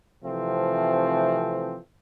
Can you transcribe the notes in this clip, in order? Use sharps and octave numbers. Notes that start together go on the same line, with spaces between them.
C3 E3 F3 A3 C4